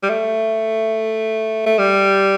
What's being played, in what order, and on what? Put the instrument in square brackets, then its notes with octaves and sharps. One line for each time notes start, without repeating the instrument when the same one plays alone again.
[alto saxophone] G3
A3
A3
G3